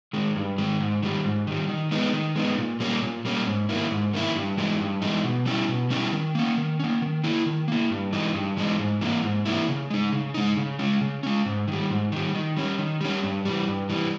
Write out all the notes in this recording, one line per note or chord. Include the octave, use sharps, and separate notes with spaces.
D#3 G#3
G2
D#3 G#3
G#2
D#3 G3
G#2
D#3 G3
D#3
G#3 B3 D#4
D#3
G#3 B3 D#4
A#2
G3 A#3 C#4
A#2
G3 A#3 C#4
G#2
D#3 A#3 E4
G#2
D#3 A#3 E4
G2
E3 G#3 D#4
G2
E3 G#3 D#4
B2
G3 C#4 E4
B2
G3 C#4 E4
D#3
A#3 C#4
D#3
A#3 C#4
D#3
A#3 E4
D#3
A#3 E4
G2
E3 G#3 D#4
G2
E3 G#3 D#4
G#2
E3 A#3 E4
G#2
E3 A#3 E4
C#3
G#3 D#4
C#3
G#3 D#4
C#3
G#3 C#4
C#3
G#3 C#4
G#2
D#3 G3
G#2
D#3 G3
D#3
G3 C#4
D#3
G3 C#4
G2
E3 G3
G2
E3 G3